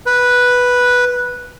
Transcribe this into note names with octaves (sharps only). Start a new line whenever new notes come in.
B4